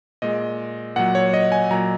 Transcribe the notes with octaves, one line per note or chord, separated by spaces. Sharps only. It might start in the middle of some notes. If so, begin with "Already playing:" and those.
A#2 G#3 D#5
A#2 F#3 F#5
C#5
D#5
G#5
A#2 F#3 A#5